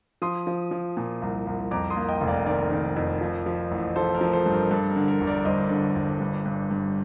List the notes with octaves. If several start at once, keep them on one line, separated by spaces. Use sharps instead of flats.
F3 C6 D#6
F3
F3
A#2
C2
C2
F2 A#5 D6
C6 D#6
A#3
D#5 G5
F1
D5 F5
D#3 A#4 D5
D#3
F2
F3
F3
A1
F3 A4 C5
A#4
F3
A4 C5
G2
A#4
G2 A4
A#4
D3
A#4
G1
A#4 D5
G1 C5 D#5
D3
G1
G2
G2
G2